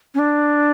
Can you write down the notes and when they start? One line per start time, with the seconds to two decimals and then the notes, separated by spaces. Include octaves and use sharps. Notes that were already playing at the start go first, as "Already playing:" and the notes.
0.14 C#4
0.19 D4